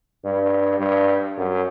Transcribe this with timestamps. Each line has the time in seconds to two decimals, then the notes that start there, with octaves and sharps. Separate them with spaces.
0.25 G2
0.80 G2
1.37 F#2